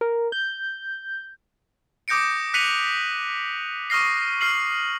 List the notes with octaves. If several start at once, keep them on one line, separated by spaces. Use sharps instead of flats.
A#4
G6
D6 D#6 G6 A#6 C#7 D7
F#6 B6 C#7 D#7 F7 F#7
C#6 D#6 F6 A#6 C7
F6 C7 F#7